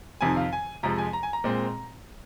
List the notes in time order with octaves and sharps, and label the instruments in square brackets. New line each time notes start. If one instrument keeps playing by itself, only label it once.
[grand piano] F2 C3 D#3 G#5
F5
G#5
F2 C3 F3 G#3 A#5
G#5
A#5
G#5
A#5
A#2 G#3 C4